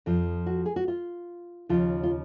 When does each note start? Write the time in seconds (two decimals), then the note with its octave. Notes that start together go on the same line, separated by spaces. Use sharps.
0.06 F2 F3
0.46 F#4
0.66 G#4
0.76 F#4
0.88 F4
1.69 D#2 C#3 F3 F4
2.03 F4